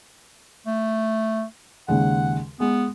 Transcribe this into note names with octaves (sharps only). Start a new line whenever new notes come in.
A3
D#2 C#3 G#3 F#5
G#3 B3